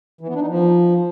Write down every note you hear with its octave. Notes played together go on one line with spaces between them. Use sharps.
E3
B3
D4
D#4
F3